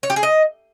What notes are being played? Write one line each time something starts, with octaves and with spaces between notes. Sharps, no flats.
C#5
G4
G#4
D#5